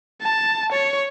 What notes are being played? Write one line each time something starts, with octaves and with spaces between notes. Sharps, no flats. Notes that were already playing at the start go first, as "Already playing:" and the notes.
A5
C#5